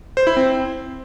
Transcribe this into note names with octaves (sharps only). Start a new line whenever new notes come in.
C5
E4
C4